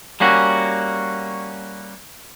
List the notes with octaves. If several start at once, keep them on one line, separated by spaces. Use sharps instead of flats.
G3 A#3 C#4 F#4